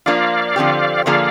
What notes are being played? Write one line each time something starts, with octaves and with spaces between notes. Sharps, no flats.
F3 A#3 D4 F4 D5 F5
D3 F3 C4 G4
D3 F3 A#3 F4 G#4 D5 F5